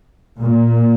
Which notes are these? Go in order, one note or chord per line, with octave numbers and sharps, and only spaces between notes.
A#2